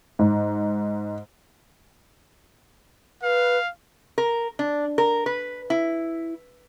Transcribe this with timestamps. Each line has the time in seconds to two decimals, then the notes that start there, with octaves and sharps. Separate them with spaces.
0.19 G#2
3.23 B4 F5
4.18 A#4
4.59 D4
4.98 A#4
5.26 B4
5.70 E4